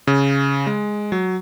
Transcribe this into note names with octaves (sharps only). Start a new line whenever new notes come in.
C#3
G#3
F#3